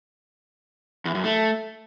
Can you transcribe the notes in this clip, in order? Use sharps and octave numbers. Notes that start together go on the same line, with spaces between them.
E2
F#2
A3